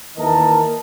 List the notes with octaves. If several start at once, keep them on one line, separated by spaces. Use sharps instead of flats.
D#2 E3 A#4 D#5 A5